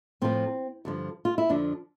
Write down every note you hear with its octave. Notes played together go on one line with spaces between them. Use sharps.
A2 F3 C4
G2 D3 F3
F4
E4
F2 D3 F3 D4